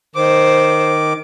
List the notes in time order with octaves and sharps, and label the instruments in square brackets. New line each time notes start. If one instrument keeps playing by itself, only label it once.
[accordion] D#3 D6 [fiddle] C5